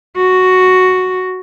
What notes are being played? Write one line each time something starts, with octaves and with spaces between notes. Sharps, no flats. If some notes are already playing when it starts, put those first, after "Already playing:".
F#4